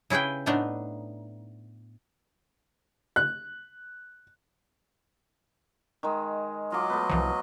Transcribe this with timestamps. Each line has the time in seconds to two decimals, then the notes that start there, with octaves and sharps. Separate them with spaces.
0.10 C#3 E4 G#4 B4 G5
0.46 A2 A3 B3 D4 D#4
3.16 F#6
6.03 D#3 G#3
6.72 F#3 F4 D#5 D6
6.90 A3 B3
7.10 C2 E3 F3